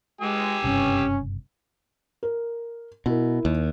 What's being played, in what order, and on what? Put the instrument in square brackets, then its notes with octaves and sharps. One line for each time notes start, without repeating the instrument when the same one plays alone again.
[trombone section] G#3 [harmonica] G4 G#5 E6
[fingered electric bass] F#1 G2 C3 [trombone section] C#4
[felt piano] A#4
[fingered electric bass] B2 [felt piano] E4 A#4
[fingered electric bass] D#2